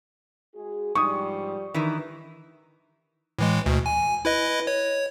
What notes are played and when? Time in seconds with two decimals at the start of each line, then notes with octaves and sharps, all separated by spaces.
0.54 G#3 F#4 G#4
0.95 G#2 F3 G3 C#6 D#6
1.74 D#3 E3
3.39 A2 E3 G#3
3.66 D2 B2
3.86 G#5
4.25 E4 B4 D#5
4.67 C#5